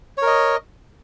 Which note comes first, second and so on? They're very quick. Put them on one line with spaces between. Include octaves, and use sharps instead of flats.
C#5 A#4 D#5